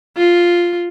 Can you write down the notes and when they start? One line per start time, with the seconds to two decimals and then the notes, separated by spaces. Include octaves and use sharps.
0.17 F4